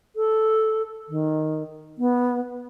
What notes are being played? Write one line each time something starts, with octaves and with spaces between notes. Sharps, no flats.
A4
D#3
B3